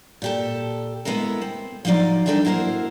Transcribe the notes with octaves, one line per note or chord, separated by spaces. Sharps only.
A#2 G4 A4
G#3 B3 E4 A4 A#4
C4
F3 F#3 D#4 F4 D5
E3 G3 D4 D#4 A4 A#4
F#3 A#3 E4 A#4 C5